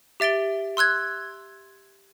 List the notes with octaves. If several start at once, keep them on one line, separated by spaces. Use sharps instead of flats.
G4 E5 A6 D7 G7
C6 E6 F#6 G#6